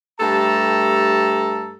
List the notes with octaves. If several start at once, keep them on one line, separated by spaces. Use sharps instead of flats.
G2 A3 G4 A4 A5 A#5